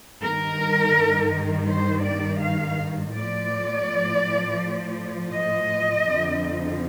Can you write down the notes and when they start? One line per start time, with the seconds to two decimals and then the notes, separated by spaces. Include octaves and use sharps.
0.21 G2 D#3 A#4
1.68 C5
2.04 D5
2.40 F5
3.13 A2 F3 D5
5.33 D#5
6.07 F2 D3 F3